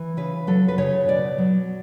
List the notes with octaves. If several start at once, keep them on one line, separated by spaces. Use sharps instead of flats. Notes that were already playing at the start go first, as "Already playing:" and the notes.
Already playing: E3
C#3 B4
F#3 A4
B4
C#3 C#5
B2 D5
F#3